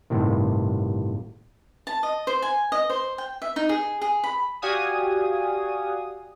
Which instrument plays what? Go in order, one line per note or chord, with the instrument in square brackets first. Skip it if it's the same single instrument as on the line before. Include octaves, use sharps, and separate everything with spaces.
[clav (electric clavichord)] G1 A2 C3 D#3
[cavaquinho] A5
D#5
C5
G#5
D#5
C5
G5
E5
D#4
G#4
G#4
B5
[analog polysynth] F#4 G4 D5 F5 G#5 D#6